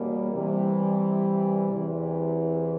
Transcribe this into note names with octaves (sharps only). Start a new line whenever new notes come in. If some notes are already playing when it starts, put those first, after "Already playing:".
Already playing: E2 B2 G3 A#3 C#4
C3 E3 G3
E2 C3 E3